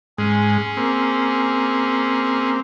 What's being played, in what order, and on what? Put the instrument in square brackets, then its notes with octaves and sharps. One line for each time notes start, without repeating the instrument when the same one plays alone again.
[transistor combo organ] G#2 G#3 [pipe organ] C#4 G#4
[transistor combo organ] A#3 C4